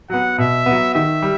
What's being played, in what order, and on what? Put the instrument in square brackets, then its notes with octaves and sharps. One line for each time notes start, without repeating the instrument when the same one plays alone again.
[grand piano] F#3 B3 [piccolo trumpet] F#5
[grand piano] B2 [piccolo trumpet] E5
[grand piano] B3
F#3
[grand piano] D#3 [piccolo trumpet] E5
[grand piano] G3